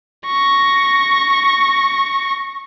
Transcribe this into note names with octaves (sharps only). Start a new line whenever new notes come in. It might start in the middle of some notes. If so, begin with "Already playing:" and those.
C#6 A#6